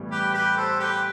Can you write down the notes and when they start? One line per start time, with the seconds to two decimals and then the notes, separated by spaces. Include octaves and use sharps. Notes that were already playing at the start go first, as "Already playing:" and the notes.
Already playing: A2 E3 G3 B3
0.11 G4 B4
0.34 G4 B4
0.57 A4 C5
0.80 G4 B4